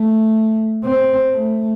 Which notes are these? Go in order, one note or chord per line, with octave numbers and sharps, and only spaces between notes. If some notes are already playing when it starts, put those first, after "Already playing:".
Already playing: A3
C4
A3